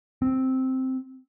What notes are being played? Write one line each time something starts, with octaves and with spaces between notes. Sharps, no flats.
C4